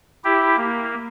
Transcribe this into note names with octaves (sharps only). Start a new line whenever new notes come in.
E4 G4
A#3